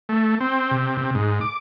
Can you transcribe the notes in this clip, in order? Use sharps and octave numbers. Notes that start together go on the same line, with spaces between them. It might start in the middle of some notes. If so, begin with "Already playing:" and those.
A3
C4
C3
C3
G#2
D6